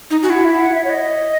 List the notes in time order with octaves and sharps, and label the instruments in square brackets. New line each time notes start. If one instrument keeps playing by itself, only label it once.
[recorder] D#4
[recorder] F#4 [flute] G#5
[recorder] E4 [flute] F#5
[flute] E5
F#5
E5
C#5
D#5